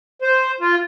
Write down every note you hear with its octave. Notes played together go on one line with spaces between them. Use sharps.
C5
F4